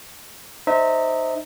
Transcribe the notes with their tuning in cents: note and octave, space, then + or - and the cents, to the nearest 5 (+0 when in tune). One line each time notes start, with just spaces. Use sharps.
D#4 -25 C5 +0 E5 -30